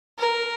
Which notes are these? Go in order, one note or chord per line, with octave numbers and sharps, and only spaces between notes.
A#4